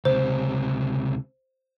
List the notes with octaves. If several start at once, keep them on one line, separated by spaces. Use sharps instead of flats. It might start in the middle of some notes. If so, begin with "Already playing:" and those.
C#2 C3 C5